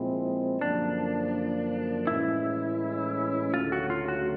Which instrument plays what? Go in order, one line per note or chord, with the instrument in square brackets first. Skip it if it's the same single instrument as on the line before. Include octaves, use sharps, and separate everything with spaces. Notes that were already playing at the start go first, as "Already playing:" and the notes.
Already playing: [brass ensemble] A#2 F3 G#3 C4 E4
[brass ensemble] F#2 D3 F3 A#3 [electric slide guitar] D4
[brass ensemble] A2 E3 G#3 C#4 [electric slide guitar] E4
[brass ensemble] D2 C#3 F#3 A3 [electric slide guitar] F4
[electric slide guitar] F#4
F4
F#4